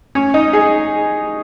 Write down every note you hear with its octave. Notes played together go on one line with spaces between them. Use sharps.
C#4
D#4
G#4